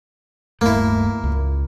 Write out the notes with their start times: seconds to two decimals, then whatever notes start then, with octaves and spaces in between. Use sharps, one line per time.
0.61 D1 G2 A3 A#3 E4
1.24 C#2